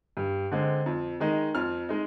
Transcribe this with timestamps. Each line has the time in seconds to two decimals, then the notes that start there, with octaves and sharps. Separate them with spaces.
0.17 G2
0.51 D3 G#3 C4
0.86 F2
1.20 D#3 G#3 D#4
1.55 F2 F6
1.89 G#3 D#4